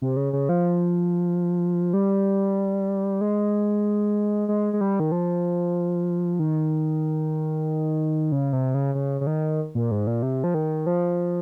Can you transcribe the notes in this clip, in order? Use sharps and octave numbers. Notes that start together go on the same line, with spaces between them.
C3
C#3
C#3
F3
G3
G#3
G#3
G#3
G3
D#3
F3
D#3
C#3
C3
C#3
C#3
C#3
D#3
A#2
G#2
A#2
C3
F3
D#3
F3